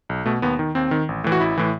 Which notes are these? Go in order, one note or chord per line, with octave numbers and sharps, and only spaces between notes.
B1
B2 A3
D#2 B3
D#3
D#2 C4
D#3
A1
A2 E3
F#4
A1 E4
A2 E3